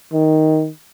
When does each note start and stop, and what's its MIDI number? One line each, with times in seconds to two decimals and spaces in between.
0.13 0.69 51